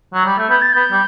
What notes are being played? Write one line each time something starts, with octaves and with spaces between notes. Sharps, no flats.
F#3
G3
A3
B3 G6
A6
B3 G6
G3